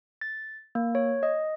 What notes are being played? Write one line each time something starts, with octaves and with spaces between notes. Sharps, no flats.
A6
A#3
C#5
D#5